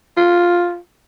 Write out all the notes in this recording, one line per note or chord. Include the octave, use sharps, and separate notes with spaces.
F4